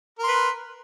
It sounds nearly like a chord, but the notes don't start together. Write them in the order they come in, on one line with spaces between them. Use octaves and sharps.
A#4 C6 B4